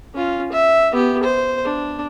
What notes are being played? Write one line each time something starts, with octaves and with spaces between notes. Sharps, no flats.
C#4 F4
E5
B3 G4
C5
D4